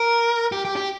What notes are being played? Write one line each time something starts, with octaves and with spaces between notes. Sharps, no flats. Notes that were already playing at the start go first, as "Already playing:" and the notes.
Already playing: A#4
G4
G4
G4